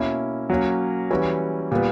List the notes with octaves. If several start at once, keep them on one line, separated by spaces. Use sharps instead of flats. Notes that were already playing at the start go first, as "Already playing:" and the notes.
Already playing: B2 A#3 C#4 E4
F#3 A#3 C#4
E3 G3 C#4 F#4
A#2 G3 B3